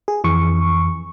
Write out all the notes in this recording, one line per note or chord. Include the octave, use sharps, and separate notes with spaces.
G#4
F2 E3 C#6